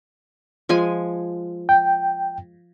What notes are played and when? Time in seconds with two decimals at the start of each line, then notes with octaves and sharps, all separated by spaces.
0.69 F3 G#3 G#5
1.69 G5